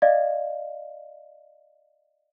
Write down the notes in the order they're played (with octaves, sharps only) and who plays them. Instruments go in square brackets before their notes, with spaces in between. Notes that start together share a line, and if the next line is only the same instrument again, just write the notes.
[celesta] D5 D#5 F5